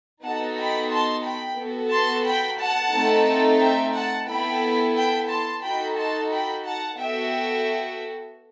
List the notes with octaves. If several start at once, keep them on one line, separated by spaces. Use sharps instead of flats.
B3 D#4 F#4 A4 F#5 A5
G5 B5
A5 C6
G5 B5
B3 F#4 A4
A5 C6
G5 B5
F#5 A5
A3 C4 D#4 A4
E5 G5
F#5 A5
B3 E4 A4 G5 B5
G5 B5
A5 C6
D#4 F#4 A4 G5 B5
A5 C6
G5 B5
F#5 A5
B3 F#4 A4 E5 G5